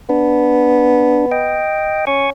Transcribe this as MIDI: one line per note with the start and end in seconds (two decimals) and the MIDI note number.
0.09 1.65 59
0.09 1.26 62
1.32 2.05 75
1.32 2.05 79
2.07 2.30 61
2.07 2.30 80
2.07 2.30 85